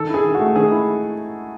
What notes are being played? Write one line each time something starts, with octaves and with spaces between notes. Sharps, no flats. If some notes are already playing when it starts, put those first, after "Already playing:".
Already playing: D#3 A4
E4 G#4
D#3
F#4
A3
D#3 G#4
E4